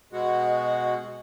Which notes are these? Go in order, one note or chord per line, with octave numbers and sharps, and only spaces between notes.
B2 G#3 F#4